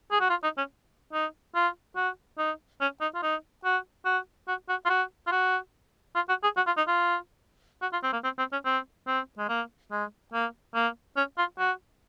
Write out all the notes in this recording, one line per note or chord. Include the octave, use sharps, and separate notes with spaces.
G#4
F#4
F4
D#4
C#4
D#4
F4
F#4
D#4
C#4
D#4
F4
D#4
F#4
F#4
F#4
F#4
F4
F#4
F4
F#4
F4
F#4
G#4
F#4
F4
D#4
F4
F#4
F4
C4
A#3
C4
C4
C#4
C4
C4
G#3
A#3
G#3
A#3
A#3
C#4
F4
F#4